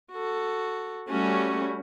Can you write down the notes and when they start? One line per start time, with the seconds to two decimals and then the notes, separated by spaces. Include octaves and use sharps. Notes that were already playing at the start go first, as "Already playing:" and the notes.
0.12 F#4 A4
1.09 G3 A3 C#4 F#4